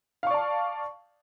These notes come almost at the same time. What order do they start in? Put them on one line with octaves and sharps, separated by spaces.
F5 C#6 D5 A5